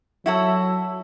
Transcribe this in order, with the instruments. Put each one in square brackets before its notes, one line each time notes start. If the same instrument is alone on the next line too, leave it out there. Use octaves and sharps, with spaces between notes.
[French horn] F#3 [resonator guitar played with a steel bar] E4 F#4 A4